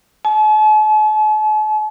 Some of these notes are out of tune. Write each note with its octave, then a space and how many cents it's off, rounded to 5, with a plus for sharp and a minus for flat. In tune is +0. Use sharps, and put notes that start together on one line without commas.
A5 -45